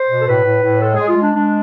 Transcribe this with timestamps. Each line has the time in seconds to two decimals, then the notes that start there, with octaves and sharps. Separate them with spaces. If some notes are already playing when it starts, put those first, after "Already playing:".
Already playing: C5
0.09 B2
0.20 A4
0.27 A2 B4
0.45 A2
0.63 A2
0.81 G#3 A4
0.95 G#3 G#4
1.08 F4
1.17 G#3 D4
1.35 G#3 D4